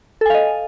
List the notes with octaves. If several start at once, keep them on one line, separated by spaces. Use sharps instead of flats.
A4 D#5 F5 G#5